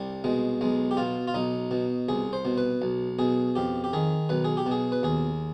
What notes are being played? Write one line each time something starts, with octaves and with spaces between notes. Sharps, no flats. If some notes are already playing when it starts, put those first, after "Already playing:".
Already playing: C2 G3
B2 G#3
B1 G#3
G4
B2 F4
F4
B1 D#4
B2
C2 G#4
C5
B2
B4
B1
B2 G#4
F2 G4
G4
D#3 G#4
B1 B4
G#4
G4
B2 G#4
B4
D#2 G#4